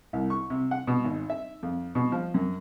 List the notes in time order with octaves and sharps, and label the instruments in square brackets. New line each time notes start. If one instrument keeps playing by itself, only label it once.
[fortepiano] C2
C#6
C3
F#5
B2
G#1
E5
F2
B2
F3
F#2